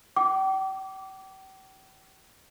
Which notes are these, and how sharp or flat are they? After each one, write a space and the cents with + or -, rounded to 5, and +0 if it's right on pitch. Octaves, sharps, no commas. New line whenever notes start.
G5 -40 D6 -20